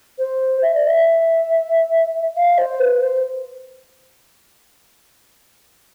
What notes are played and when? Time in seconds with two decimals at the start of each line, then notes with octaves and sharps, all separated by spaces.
0.19 C5
0.62 E5
0.74 D5
0.87 E5
2.36 F5
2.58 C5
2.79 B4
3.01 C5